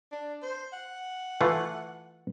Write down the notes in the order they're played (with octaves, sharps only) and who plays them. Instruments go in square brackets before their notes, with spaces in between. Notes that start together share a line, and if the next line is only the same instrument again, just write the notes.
[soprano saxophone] D4
C5
F#5
[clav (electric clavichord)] E3 A3 F4